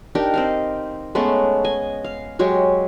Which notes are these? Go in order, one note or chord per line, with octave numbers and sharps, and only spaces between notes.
D4 D#4 G4 A#4
C4 D#5 F5
G#3 A3 B3 C#4
D#5 G#5
F5
F#3 G#3 G4 C#5